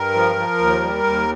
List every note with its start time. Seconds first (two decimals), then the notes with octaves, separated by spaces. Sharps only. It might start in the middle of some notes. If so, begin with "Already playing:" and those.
Already playing: G2 A#4
0.14 F3
0.36 F3
0.59 D#2
0.81 G3
1.04 D#2